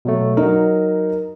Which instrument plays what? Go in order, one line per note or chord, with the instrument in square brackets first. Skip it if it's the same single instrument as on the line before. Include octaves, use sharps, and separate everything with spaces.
[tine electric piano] B2 F#3 A3
[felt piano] F#3 D#4 [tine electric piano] A#4